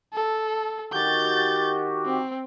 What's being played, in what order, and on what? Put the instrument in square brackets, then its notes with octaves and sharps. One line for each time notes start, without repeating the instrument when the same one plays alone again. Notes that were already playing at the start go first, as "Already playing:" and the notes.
[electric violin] A4
[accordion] D#3 F#4 G4 [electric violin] G6 A6
[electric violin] C4